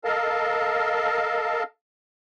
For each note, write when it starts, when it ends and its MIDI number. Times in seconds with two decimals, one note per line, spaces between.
0.04 1.63 69
0.04 1.63 70
0.04 1.63 75
0.04 1.63 77
0.04 1.63 81